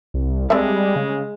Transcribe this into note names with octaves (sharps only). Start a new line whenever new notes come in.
C2
G3 G#3 C4 D4 E5
C#3